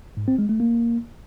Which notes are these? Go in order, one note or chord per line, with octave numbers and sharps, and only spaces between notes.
G#2
C4
G#3
A3
A#3